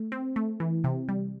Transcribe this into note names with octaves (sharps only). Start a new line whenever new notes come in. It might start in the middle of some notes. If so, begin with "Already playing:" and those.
Already playing: A3
C4
A3
E3
C3
G3